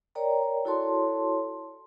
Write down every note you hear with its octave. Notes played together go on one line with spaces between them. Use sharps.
A#4 C#5 D5 G5 A#5
E4 F#4 A4 C#5 A5 C6